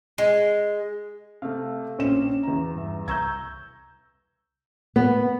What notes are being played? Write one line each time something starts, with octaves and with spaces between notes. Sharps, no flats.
G#3
C3 A3 F5
A#1 C4 C#4 E7
E2 A#5
G2 E5
C2 A#5 C#6 E6 G6 G#6
B3